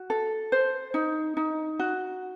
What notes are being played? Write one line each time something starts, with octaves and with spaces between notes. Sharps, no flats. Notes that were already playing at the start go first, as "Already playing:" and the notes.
Already playing: F#4
A4
C5
D#4
D#4
F#4